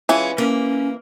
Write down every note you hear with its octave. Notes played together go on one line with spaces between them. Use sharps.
E3 G#3 C#4 F4
A#3 C#4